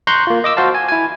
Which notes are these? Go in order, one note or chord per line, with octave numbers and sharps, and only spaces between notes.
A#5 C6 C#6 F#6 G6
A#3 F4
D#5 D6 E6
F#4 C5 F5 A5
G#5
E4 G#5